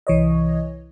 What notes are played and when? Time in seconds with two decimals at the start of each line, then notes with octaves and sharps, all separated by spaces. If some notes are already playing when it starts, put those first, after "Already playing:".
0.07 C2 E3 C#5 D#5